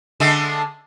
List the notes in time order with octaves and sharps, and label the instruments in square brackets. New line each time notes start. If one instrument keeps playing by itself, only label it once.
[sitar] D3 G#3 A3